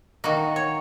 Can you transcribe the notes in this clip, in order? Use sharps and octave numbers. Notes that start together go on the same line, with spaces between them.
D#3 A#3 F#4
C#5